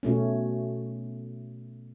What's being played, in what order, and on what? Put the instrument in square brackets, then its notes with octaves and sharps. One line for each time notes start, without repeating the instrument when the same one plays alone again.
[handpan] B2 A3 C#4